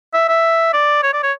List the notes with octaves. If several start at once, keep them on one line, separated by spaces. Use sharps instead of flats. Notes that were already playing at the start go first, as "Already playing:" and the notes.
E5
E5
D5
C#5
D5
C#5